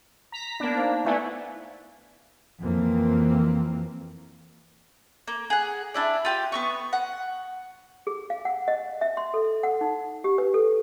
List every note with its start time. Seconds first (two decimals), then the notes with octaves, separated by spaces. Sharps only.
0.32 A#5 B6
0.60 A#3 B3 D4
0.74 D#4 C5 F5
1.05 A3 B3 E4 D5 G#5 C#6
2.60 F2 E3 A#3 C4
5.28 A#3
5.50 G#4 F#5
5.94 D4 E4 D5
6.25 F4 G4
6.52 B3 D#4 C#6
6.93 F#5
8.07 G#4
8.30 F5
8.45 F#5
8.68 D#5
9.01 E5
9.17 C6
9.34 A4
9.63 F#5
9.81 D#4
10.24 G4
10.38 B4
10.54 A4